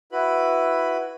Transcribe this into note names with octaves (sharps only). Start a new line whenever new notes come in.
E4 F#4 B4 B5